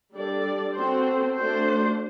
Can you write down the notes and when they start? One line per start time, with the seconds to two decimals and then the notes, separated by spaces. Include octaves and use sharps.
0.13 G3 D4 A4 D5
0.74 C4 F#4 A4 C5
1.35 A3 D4 F#4 C5